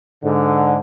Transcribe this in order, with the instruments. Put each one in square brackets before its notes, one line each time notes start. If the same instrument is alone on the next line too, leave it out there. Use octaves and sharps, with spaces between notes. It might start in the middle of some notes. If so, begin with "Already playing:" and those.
[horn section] G#2 D3